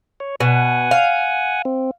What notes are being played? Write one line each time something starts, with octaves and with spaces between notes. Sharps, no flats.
C#5
B2 F#5 G#5
F5
C4